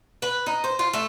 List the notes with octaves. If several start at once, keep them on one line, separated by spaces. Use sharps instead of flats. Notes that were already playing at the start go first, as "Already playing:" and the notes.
B4
D#4
C5
F4
A3